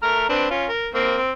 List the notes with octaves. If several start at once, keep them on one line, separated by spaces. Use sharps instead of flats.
A3 A#5 F6
C4 D4 B4
C#4 F4
A#4
A#3 C4
C4